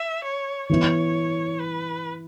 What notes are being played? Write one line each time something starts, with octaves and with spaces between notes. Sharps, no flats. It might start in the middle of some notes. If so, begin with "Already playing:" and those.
Already playing: E5
C#5
E3 B3 E4 C#5
B4